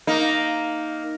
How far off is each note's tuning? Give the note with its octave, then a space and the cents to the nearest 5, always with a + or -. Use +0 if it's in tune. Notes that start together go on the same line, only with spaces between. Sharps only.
A#3 +0 D#4 +0